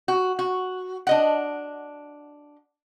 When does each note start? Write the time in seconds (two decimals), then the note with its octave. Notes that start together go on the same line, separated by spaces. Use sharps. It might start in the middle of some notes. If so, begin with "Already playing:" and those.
0.08 F#4
0.39 F#4
1.07 D4 D#5 F#5